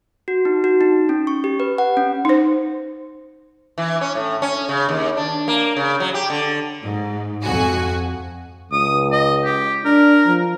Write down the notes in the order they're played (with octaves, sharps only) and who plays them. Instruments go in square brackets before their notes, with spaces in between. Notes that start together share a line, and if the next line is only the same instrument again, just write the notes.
[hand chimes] F#4
D#4
F#4
D#4
C#4
C#6
G4
B4
F#5
C#4
[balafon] D#4 C5
[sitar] E3
C#4
A2
C#4
C#3
D#2
D4
A#3
C#3
F#3
G4
D3
[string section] G#2
F2 F#4 G#5
[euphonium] C#2 [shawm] D#6
[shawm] D#5
G4
[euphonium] D4 [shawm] A#4
[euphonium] F3